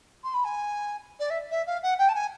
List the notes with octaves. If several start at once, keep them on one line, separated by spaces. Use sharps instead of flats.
C6
B5
G#5
D5
E5
E5
F5
F#5
G5
A5
G#5